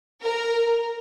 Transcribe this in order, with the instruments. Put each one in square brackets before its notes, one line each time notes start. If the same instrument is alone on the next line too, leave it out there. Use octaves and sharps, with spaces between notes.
[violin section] A#4